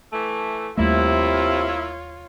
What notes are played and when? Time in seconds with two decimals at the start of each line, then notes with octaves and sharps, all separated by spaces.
0.11 E3 A3
0.77 D#2 C3 G3 A3 A#3 E4 F4 C#5